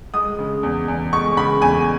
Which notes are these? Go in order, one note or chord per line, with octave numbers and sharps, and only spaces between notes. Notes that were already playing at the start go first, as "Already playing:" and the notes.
G#3 D#6
C#3
E2
E2
G#3 C#6
C#3 B5
E2 G#5